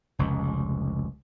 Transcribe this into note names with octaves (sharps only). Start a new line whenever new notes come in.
F1 C#2